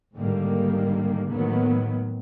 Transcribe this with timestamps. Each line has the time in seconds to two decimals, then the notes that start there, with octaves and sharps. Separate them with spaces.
0.15 G#2 D3 D#3 G3 A#3
1.31 A2 D#3 F#3 A#3 B3